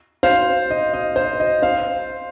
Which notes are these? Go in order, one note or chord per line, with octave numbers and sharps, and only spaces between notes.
C5 F5
D#5
D#5
C5
D#5
C5 F5